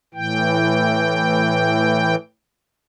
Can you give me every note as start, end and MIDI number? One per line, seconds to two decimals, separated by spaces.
0.14 2.15 45
0.14 2.15 52
0.14 2.15 79